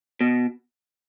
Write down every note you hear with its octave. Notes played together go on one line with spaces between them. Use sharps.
B2